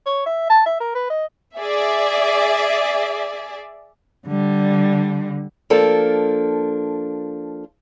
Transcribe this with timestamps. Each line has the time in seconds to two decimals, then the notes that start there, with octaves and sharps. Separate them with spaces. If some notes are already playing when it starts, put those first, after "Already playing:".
0.06 C#5
0.26 E5
0.49 A5
0.66 E5
0.80 A#4
0.95 B4
1.10 D#5
1.57 G#4 D5 E5
4.27 D3 G3
5.70 F3 A#3 D4 A4